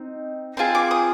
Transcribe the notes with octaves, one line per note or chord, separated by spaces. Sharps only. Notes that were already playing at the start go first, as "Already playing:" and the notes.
Already playing: C4 D#4
C4 F4 G#4
D6
D#6